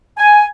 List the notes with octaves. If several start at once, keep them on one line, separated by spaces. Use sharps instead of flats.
G#5